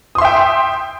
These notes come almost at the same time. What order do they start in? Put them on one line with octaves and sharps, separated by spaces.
D#6 C6 E5 G5